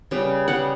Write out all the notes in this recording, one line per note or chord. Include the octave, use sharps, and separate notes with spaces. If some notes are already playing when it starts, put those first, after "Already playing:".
C#3 G3 B3
C#3 G3 B3 F#5